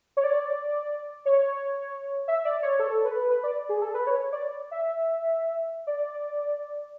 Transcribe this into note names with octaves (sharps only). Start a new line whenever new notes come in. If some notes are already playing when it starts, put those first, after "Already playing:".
C#5
D5
C#5
E5
D5
C#5
A4
B4
B4
D5
G#4
A4
B4
C#5
C#5
D5
E5
D5